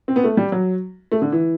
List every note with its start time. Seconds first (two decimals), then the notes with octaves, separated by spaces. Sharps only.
0.08 C4
0.16 B3
0.24 A3
0.37 G3
0.52 F#3
1.12 A3
1.22 D3
1.32 E3